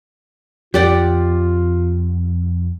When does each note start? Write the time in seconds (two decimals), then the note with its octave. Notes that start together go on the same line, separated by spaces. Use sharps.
0.74 F2 F4 G4 D5 F#5